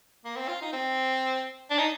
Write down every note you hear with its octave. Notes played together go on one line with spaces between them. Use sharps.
A#3
C4
F4
D#4
C4
D4
D#4